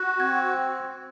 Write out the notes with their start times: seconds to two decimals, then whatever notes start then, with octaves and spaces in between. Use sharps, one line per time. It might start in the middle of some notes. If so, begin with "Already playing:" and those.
Already playing: F#4 F#6
0.19 C4 G#6